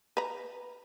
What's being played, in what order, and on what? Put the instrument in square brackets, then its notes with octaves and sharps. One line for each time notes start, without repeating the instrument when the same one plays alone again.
[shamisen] B4 A#5